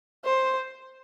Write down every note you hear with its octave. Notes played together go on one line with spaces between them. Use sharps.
C5